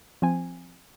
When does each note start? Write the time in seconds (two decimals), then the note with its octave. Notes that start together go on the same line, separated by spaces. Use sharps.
0.22 F3 C4 G#5